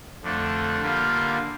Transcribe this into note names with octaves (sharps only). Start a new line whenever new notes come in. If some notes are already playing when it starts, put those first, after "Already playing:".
F2 D3 A3 D4
D3 G3 A#3 F4